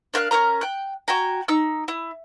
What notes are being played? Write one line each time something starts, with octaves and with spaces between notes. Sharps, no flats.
D4 A#4 F5 F#6
C#4 E4 A#4 A#5
G5 F#6
F#4 G5 G#5 A#5
D#4 E6
E4